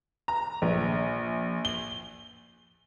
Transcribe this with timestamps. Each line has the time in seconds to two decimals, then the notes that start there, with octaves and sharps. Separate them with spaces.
0.28 A#5
0.62 A#1
1.65 G7